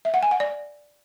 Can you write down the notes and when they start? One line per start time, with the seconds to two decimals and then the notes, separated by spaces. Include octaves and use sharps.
0.05 E5
0.14 F#5
0.23 G#5
0.31 F#5
0.40 D5